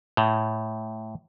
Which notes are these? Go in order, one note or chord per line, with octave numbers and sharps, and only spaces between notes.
A2